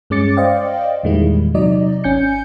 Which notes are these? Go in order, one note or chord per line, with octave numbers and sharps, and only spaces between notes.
G2 G#3 C#4 D6 A6 C#7
C5 D5 D#5 F5 G5
E2 A#2 D#3 G3 G#3 E4
C3 F#3 D#4 D5 D#5
G#1 C#4 G#5 G6 C#7